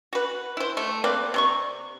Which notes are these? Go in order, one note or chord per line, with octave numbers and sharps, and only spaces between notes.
F#4 B4
E4 C5
A3
A#3 C4 B4 D5
C3 C6 C#6